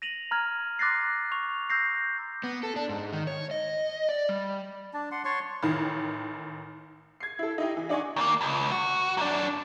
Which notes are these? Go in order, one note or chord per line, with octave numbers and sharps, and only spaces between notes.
A#6 D#7 F7 F#7
A#5 F6 G#6
C6 D6 F#6 A6 A#6 C7
C#6 F7
E6 G6 A#6 C7
B3
A4
D4
G#2
D#3
C#5
D#5
D5
G3
D4 A5
F#5 C6
C#5 A5 C6 C#6
A1 D#3
G#6 C7
E4 A4
D#4 E4 G4
E3
D4 D#4 D5 F#5 G#5 C#6
D#2 A#3
C#2
F#4
F#2 D4